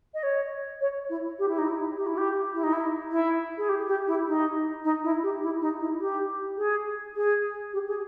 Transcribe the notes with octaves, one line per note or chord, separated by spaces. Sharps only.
D#5
C#5
C#5
E4
G4
E4
D#4
E4
G4
E4
G4
E4
D#4
E4
E4
G#4
G4
G4
E4
D#4
D#4
E4
G4
E4
D#4
E4
G4
G#4
G#4
G4
G#4